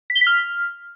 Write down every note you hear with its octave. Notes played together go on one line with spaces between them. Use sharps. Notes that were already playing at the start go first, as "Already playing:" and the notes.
B6
G7
B6
F6